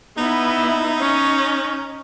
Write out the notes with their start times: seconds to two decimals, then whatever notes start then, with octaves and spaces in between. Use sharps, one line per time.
0.17 B3 D#4 E4
1.01 C#4